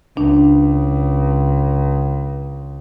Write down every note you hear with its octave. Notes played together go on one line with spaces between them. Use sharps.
C#2 D4